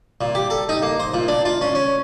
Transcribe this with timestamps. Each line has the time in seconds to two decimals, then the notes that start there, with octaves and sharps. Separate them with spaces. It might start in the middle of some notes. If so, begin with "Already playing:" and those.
0.21 A#2
0.35 G4
0.50 A4
0.69 D#4
0.82 A#3
0.99 C5
1.14 A#2
1.28 D4
1.45 F4
1.61 C#4
1.75 C#4